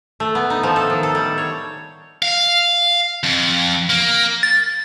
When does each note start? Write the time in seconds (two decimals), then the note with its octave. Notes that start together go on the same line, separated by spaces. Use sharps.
0.20 A3
0.35 B3
0.50 D#4
0.63 F3
0.76 A4
0.90 D#3
1.03 A4
1.15 G3
1.38 C#5
2.23 F5
3.24 F2
3.90 A#3
4.43 A6